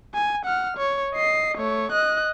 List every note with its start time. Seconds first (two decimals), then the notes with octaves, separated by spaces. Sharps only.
0.14 G#5
0.45 F#5 F6
0.77 C#5
1.14 D#5 C7
1.57 A3 C#5
1.92 D#5 F#6